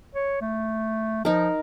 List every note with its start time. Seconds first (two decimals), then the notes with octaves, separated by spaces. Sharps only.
0.15 C#5
0.41 A3
1.25 F3 D#4 A#4